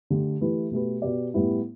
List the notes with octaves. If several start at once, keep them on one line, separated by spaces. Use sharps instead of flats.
D3 A3 G4
E3 A3 E4 G4 B4
B2 A3 G4 B4
B2 B3 G4 D5
A2 G3 B3 E4